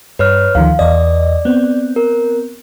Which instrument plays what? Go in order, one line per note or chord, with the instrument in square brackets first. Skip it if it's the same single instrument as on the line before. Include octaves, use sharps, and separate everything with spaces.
[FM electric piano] G2 [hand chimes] B4 C#5 F6
[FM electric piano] D2 D#3 F3 [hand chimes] F5
[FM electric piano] E2 D#5 [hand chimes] D5
[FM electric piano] B3 C4
[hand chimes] A#4